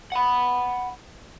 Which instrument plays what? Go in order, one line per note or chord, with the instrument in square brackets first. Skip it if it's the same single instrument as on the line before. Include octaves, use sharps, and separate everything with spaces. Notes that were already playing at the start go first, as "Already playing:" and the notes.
[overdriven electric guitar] F#5 B5